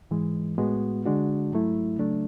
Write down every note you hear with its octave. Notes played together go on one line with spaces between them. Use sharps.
G#2 E3 G#3
A2 G#3 B3 F#4
D3 G#3 D4 F#4
G#2 F#3 A3 E4
C#3 F#3 A3 D4